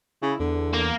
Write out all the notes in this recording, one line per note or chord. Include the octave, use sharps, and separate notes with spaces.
C#3 E4
E2 D3
A#3